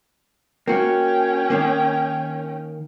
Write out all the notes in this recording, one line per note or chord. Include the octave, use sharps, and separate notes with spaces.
A#3 C#4 F#4 G5
D#3 A#3